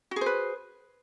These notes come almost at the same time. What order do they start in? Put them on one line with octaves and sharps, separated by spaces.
F#4 G#4 C5 B4